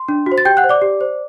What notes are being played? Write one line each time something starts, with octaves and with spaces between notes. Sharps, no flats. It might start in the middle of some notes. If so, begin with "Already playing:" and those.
Already playing: C6
D4
F#4
C5
A6
G4 G5 G6
F#5 F#6
C5
D5 D6
G4
C5